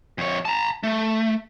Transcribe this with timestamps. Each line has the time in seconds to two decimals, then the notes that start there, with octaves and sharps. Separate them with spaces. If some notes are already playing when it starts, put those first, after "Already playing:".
0.18 F2 C#5
0.45 A5 A#5
0.83 A3